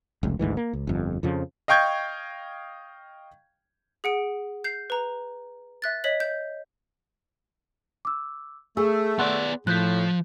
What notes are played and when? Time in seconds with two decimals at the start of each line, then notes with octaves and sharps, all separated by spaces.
0.23 F1 C#2
0.39 G#1 D2 G#2 E3
0.57 A#3
0.73 C#2
0.87 G1 F2
1.23 F2 C#3 F3
1.68 D#5 F5 G5 C#6 G6 G#6
4.04 G#4 F#5 D7
4.64 G6 C7
4.90 B4 A#5
5.82 E5 F#6 A6
6.04 C#5 D#5 B6 F#7
6.20 G6
8.05 D6 E6
8.77 A3 G#4 E6
9.19 B3 D5 F#5 C6 F#6
9.67 A2 F3 F#6 G6 B6